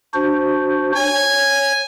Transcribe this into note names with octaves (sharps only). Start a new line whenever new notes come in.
D4 F#4 C5
C#5 G#5